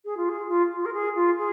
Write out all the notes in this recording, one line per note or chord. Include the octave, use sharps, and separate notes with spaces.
G#4
F4
G#4
F4
F4
A#4
G#4
F4
G#4